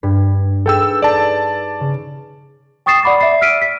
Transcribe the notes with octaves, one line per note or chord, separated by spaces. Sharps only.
G2 G#6 B6
D#4 G#4 A4 B4 G5 E6
D5 A5
C#3
G5 C#6 D#6 A6 C7 E7
D5 F#5 B5 D6 A6
D5 E5 C7
E6 F6 B6 D7 D#7
B6